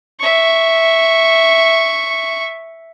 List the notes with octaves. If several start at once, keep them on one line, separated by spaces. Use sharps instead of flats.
E5 C#6